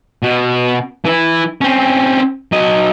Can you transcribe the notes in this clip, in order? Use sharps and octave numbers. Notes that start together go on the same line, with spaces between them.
B2 F#4
E3 E4
C4 C#4
F#3 D#5